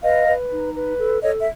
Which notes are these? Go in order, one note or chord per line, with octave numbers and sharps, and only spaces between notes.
B4 D#5 F5
B4
D#4
B4
A4
A4 C#5 D#5
E5